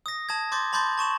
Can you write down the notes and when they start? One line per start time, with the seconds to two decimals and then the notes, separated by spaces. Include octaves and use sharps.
0.06 D#6 A#6
0.29 A5 D#6 G#6
0.52 C6 D6 G6 A6
0.73 A5 B5 C6 D6 G6 A6
0.97 A5 C#6 E7 F#7